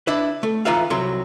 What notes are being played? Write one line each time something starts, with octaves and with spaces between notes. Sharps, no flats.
D4 E4 B4
A3
E3 D#4 F4 B4 E5 F5
C2 C3 F#3 C6